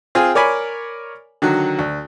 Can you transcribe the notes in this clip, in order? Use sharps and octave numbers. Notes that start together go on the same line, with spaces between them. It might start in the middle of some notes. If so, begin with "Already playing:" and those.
C4 F4 G#4 G#5
A#4 C#5 D5 G#5 B5
D3 D#3 F#3 F#4
D2